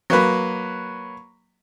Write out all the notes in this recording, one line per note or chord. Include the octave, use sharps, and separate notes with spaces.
F#3 A#3 B4